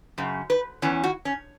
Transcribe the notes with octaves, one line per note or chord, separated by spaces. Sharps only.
F#2 C#3
B4
E2 E3 C#4
F#4
C#4